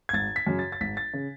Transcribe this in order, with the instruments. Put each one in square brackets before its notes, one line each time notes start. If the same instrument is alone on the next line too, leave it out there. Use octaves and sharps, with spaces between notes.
[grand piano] G#6
G#1 A6
B6
F#2 C#3
A6
A6
G#1 B6
A6
C#3